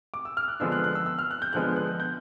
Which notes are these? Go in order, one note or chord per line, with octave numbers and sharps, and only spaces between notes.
D6
E6
F6
F#6
D3 F3 G#3 B3 D4 E6
F#6
F#6
E6
E6
F6
F#6
G6
D3 F3 G#3 B3 F#6
F#6
G6